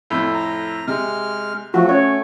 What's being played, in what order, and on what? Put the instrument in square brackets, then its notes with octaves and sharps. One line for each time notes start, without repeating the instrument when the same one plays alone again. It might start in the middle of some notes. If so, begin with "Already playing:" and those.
[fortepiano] F2 A2
[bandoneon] A#5
[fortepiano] C3 [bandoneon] G#3 F6
[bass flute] F3 [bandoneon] A3 [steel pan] F#4
[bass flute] C#4 [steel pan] C#5